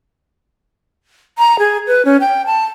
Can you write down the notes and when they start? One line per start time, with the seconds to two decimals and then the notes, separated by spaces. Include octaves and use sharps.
1.38 A#5
1.59 G#4
1.87 B4
2.05 C#4
2.21 G5
2.46 A5